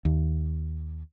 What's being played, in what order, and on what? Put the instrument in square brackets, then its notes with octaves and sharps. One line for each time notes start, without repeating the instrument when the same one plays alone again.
[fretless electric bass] D#2